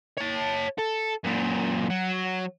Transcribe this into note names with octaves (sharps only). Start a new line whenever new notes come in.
C#5 A5
A4
F#2 A#2
F#3